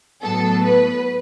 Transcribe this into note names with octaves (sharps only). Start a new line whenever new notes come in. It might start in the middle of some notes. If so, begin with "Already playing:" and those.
A2 F#3 B3 A4
B4